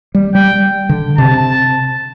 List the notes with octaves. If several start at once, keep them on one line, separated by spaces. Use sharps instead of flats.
G3
G3 G5
D3
C3 A5